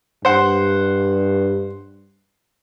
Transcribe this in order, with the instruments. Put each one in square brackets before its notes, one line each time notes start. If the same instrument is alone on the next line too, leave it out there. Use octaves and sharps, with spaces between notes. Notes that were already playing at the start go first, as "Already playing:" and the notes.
[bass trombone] G2 [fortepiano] C5 F#5